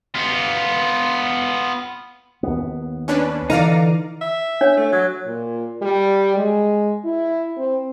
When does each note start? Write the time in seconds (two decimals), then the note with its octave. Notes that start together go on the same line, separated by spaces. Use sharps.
0.15 B3 F4
2.43 D#2 B3
3.08 C#4 D4 B4
3.50 D3 E3 D#4 D5 F5 A#5
4.21 E5
4.61 D4 C#5
4.77 A3
4.93 F#3
5.26 A#2
5.82 G3
6.36 G#3
7.05 E4
7.57 C4